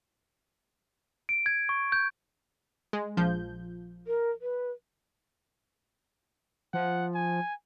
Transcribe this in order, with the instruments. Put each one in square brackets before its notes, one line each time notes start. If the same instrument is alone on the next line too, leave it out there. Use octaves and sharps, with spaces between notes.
[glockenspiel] D7
G#6
C#6
G6
[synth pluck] G#3
A#1 F3 G6
[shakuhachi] A#4
B4
[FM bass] F3 [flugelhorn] F#5
[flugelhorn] G#5